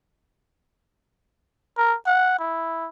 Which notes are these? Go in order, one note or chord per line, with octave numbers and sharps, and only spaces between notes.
A#4
F#5
E4